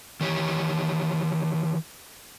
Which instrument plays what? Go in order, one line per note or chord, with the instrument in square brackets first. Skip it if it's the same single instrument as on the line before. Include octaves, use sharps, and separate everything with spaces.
[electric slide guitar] D#3 E3 G4 C#5